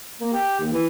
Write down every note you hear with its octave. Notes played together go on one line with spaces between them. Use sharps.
A#3
G4
D#2
E3